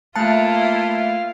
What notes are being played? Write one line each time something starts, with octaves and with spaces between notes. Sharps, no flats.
A3 A#3 E4 F4 F5 A5 F#6 C#7